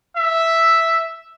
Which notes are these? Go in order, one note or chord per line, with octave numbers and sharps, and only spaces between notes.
E5